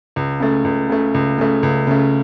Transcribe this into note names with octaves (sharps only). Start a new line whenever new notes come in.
C#2
C#3 A3
C#2
C#3 A3
C#2
C#3 A3
C#2
C#3 A3